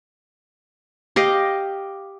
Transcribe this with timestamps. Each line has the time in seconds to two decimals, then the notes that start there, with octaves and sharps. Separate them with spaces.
1.16 G4 D#5 F5